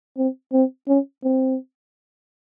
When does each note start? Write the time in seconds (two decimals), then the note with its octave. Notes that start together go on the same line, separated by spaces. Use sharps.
0.17 C4
0.53 C4
0.88 C#4
1.24 C4